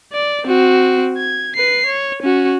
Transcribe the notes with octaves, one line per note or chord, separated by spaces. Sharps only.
D5
C4 F#4
G#6
B4 C7
C#5
C#4 F#4